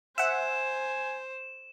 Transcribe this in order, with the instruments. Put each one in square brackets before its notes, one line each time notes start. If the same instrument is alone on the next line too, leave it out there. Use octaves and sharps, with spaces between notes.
[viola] C5 [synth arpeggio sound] E5 F#5 [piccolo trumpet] G#5 [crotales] E7